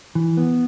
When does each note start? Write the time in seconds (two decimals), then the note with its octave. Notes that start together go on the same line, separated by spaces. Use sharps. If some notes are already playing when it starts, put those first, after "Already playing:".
0.15 E3
0.37 B3